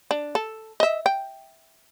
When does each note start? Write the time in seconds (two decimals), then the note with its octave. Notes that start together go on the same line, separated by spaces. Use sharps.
0.11 D4
0.35 A4
0.80 D#5 E5
1.06 G5